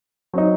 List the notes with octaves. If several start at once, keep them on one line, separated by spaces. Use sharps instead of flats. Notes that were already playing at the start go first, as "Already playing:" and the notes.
F#3 C4 D#4